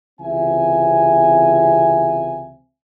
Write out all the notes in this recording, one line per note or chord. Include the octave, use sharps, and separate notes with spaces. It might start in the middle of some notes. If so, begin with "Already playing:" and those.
C#2 C3 E3 C4 E5 G#5